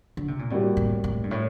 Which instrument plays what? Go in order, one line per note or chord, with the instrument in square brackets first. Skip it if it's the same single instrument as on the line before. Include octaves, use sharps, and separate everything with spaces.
[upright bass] D3
C3
A#2
[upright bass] A2 [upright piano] C3 G3 A#3 F#4
[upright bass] A2
A2
G2
A2